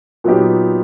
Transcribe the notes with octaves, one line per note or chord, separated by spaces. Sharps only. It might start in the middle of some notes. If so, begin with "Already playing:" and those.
A#2 F#3 B3 D#4 G4